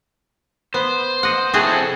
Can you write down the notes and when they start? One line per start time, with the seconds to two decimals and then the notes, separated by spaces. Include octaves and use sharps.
0.74 B3 C5
1.23 D#5 F#5
1.53 C3 C4 E4 F#4 G#4 A4